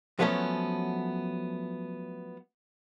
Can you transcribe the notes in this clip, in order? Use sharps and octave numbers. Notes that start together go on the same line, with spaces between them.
F3 F#3 A3 B3 C#4